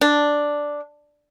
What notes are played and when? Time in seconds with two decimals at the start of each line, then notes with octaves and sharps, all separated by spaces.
0.01 D4